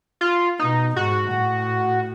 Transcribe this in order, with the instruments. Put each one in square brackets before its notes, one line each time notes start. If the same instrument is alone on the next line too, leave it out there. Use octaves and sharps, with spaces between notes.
[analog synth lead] F4
[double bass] B2 [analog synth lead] D#4
[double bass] G#2 [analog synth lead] F#4
[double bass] A2